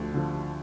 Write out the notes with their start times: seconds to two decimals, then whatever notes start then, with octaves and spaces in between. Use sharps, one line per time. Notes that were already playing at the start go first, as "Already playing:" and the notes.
Already playing: D2 D3 F3
0.14 D3 F3